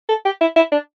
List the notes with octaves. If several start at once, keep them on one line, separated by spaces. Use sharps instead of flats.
A4
G4
E4
E4
D4